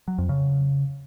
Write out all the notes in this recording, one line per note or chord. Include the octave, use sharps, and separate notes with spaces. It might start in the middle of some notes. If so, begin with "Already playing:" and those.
F#3
F2
C#3